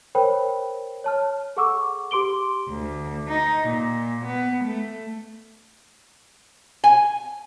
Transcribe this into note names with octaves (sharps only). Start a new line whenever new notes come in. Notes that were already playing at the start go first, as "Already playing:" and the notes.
A#4 C5 C#5 G5 B5
C#5 A5 F6
G#4 A4 F#5 C#6 D6 E6
G4 C6 D6 D7 G7
D2
D#4
A#2
B3
A3
G#5